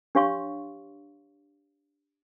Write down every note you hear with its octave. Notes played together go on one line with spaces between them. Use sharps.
D4 G4 C#5 F5 C6 C#6